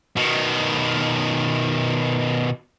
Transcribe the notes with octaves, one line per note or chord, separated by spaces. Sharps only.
B2 D#3